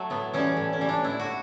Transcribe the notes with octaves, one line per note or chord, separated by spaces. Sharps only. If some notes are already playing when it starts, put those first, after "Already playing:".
Already playing: F#3 A3
A2 B3
E3 G3 C#4
A2
C#4
E3 G3
D4
A2 E4
F#4